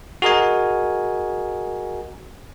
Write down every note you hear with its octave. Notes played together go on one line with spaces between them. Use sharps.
F#4 G#4 A#4 D#5 G#5